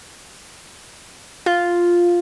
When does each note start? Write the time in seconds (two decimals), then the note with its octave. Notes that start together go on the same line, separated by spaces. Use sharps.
1.46 F4